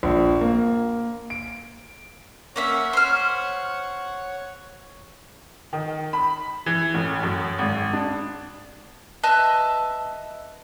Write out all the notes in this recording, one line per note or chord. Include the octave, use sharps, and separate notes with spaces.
A#1
A#3
D7
A#3 C#4 C#5 E5 F#5
C5 F6
D#3
B5
E3
A1
F#2
G#1
D4
B4 D#5 E5 A5